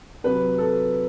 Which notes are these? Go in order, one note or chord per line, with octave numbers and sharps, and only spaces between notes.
C3 F#3 B4
A4